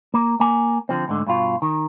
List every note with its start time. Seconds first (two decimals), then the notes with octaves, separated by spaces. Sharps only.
0.14 A#3
0.40 A#3 G#5
0.89 D3 F3 C4
1.08 D2 G#2 D3
1.27 G2 B2 F4
1.62 D#3